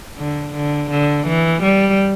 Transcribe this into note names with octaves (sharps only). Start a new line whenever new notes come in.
D3
D3
D3
E3
G3